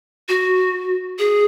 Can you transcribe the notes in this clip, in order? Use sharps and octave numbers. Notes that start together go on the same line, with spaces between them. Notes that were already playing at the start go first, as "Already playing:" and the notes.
F#4
G#4